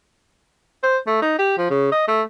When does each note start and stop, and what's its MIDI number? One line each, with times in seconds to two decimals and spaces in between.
0.83 0.98 72
1.07 1.18 57
1.22 1.35 63
1.39 1.56 67
1.57 1.68 53
1.70 1.89 49
1.92 2.04 75
2.08 2.22 57